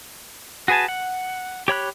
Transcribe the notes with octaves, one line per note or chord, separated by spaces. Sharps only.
F#4 G#4 B4 G#5 A5
F#5
G4 C#5 B5 F#6